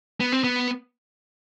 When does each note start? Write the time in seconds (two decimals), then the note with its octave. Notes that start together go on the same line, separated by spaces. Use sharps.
0.20 B3
0.32 C4
0.44 B3